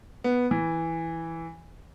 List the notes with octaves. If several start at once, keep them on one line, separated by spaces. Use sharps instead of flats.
B3
E3